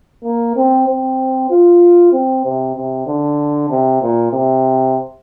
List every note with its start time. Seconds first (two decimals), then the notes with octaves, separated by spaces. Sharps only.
0.24 A#3
0.56 C4
0.87 C4
1.50 F4
2.12 C4
2.45 C3
2.76 C3
3.07 D3
3.70 C3
4.02 A#2
4.33 C3